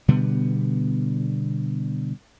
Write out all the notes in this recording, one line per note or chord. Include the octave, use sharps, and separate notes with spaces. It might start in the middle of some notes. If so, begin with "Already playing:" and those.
B2 D3 G3 B3